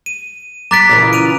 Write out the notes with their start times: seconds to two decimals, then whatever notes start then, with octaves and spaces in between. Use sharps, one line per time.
0.06 D#7
0.71 A#5 D6 F#6 A6 B6 D7
0.89 A#2 C#3 E3
1.13 D7 D#7 F7